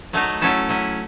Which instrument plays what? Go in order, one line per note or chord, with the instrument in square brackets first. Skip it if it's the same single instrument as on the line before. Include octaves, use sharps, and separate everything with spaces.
[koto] F#3 A3 D#4
F#3 C#4 E4 A4
F#3 C#4 E4